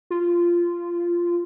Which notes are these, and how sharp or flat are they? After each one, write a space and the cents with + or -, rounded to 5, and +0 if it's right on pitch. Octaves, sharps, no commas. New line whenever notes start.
F4 -15